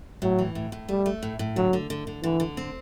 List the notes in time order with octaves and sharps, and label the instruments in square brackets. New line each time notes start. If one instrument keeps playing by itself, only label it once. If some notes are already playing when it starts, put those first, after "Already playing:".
[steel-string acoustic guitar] A2 [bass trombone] F#3
[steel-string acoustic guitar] E3
A2
A2
[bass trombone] G3 [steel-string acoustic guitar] A3
[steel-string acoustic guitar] A3
A2
A2
[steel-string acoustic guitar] D3 [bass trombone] F#3
[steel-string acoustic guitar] D3
D3
D3
[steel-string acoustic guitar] D3 [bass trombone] E3
[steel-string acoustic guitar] D3
C4